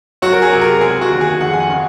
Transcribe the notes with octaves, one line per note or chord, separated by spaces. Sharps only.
F#3 F#4
A#4
G#4
C3
A#4
G#3 G#4
F#4
D#2
G#4
F2 F#5
G#5
F#5
C#3